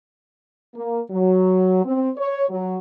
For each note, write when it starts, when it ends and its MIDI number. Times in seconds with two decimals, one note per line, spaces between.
0.76 1.00 58
1.11 1.83 54
1.85 2.10 60
2.17 2.45 73
2.50 2.78 54